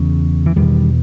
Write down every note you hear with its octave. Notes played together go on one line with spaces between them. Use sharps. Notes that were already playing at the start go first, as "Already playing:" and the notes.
Already playing: E2 C#3
E3
E2 B2 D#3 G3